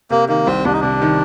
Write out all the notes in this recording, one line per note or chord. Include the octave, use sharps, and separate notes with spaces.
C3 A#3
D#3 A#3
C2 C4
C2 D4
D#4
C3 D4
D#3